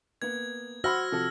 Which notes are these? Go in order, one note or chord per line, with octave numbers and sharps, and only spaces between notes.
A#3 B3 G#6
F#4 C5 F#5 B5 E6 F6 A#6
C3 F3 A4